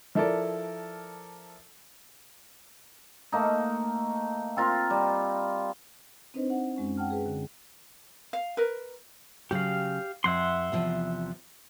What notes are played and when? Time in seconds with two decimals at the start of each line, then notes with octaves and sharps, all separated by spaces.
0.15 F3 E4 A4 A#4 D5
3.32 A3 A#3 D#4
4.57 C4 F4 A#4
4.90 G3
6.34 C4 D4 D#4 B4 C5 D#5
6.50 F#5
6.77 F#2 G#3 C#4
6.97 F#5 G5 A5 F6
7.10 G#4 B4
7.26 D3
8.33 F5
8.57 A#4 B4
9.51 C#3 F#3 G4 F5
10.24 F2 E5 F#5 C6
10.72 E2 C3 F3